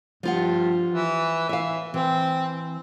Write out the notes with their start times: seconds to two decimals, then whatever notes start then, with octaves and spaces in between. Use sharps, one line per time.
0.23 G2 F3 F4 F#5
0.91 E3
1.49 E3 E5 F5
1.94 E3 C4